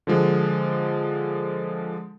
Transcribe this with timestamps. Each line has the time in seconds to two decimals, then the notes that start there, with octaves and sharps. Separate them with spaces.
0.07 D3 F3 G#3